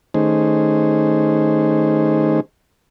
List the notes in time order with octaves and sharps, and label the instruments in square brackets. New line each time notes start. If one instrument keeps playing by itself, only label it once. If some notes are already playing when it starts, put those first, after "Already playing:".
[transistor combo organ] D#3 A3 C#4 D#4 G#4 C5